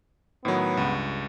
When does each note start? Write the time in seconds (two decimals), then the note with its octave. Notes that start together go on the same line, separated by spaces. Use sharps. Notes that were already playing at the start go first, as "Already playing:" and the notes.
0.45 A2 D#3 F#3 B3
0.77 C#2 G2